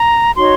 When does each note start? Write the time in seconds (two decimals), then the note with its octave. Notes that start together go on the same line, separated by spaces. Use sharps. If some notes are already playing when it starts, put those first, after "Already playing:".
Already playing: A#5
0.36 D#4 F#4 C#5 C6